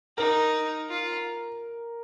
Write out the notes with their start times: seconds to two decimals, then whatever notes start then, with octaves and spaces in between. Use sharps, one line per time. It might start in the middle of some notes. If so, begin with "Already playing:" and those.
0.17 D#4 A#4
0.89 F4